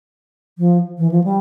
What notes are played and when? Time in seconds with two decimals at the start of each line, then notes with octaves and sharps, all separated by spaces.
0.58 F3
0.98 E3
1.11 F3
1.24 G3